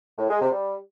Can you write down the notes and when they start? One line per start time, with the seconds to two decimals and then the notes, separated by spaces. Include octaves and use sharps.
0.18 A2
0.29 G#3
0.41 C3
0.52 G3